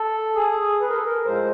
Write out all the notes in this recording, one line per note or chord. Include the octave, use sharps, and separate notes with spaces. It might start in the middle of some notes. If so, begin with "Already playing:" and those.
Already playing: A4
G#4
B4
A#4
A4
A#4
A2 F3 G#3 C5